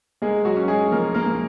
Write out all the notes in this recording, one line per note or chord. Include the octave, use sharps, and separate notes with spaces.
G#3 A#3 G#4
F#3 F#4
C#4
G#3 G#4
F3 A#3 A#4
A#3 A#4
A#3